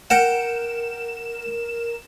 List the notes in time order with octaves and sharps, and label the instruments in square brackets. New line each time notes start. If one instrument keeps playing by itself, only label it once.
[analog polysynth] A#4 E7 [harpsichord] F#5 G5